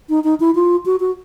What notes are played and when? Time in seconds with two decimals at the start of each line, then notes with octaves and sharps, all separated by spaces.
0.09 D#4
0.24 D#4
0.40 E4
0.55 F4
0.86 F#4
1.00 F#4